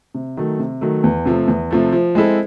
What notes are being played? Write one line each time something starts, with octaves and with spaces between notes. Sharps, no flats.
C3
D#3 F#3 A3
C3
D#3 F#3 A3
E2
C3 F3 A3
E2
C3 F3 A3
F3
G#3 C4 E4 A4